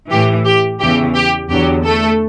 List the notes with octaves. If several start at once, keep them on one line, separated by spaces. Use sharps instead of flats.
A2 E3 G4
G4
E2 C#3 E3 G4
G4
E2 D3 F#3 G4
A3 A4